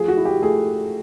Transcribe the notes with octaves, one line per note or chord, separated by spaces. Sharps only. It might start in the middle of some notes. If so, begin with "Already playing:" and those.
Already playing: F3 A3 G#4
F#4
E4
G4
A3 G#4